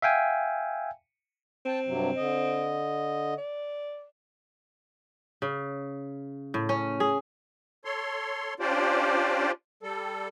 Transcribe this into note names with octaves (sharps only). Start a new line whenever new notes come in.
E5 F5 G5 G#5
C4 G5 A5
G2 C3 F#3
D3 D#5
D5
C#3
A2
C#4
G#4
A4 C#5 C6
C#4 D4 F4 G4 C5 D5
G3 A4